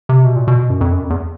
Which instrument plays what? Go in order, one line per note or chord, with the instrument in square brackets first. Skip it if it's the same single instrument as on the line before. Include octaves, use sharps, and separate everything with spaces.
[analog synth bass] C3
B2
A#2
B2
F#2
F2
F#2
F2
E2